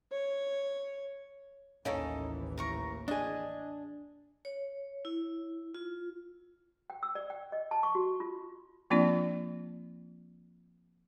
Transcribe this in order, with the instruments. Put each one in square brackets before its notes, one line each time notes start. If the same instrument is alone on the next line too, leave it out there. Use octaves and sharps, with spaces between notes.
[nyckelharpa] C#5
[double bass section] A1 D#2 E3 [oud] A#3 C#4 [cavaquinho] D#4 A4
[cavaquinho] A#4 A#5 C#6
[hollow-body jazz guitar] D4 G#4 [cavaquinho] D#5
[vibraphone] C#5
E4
F4
[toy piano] G5
E6
D5
G5
D#5
A5
C#6
F#4
F4
[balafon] F3 A#3 C4 D4 F4 D5